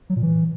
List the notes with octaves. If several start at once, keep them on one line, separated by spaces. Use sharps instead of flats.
F#3
A#2
E3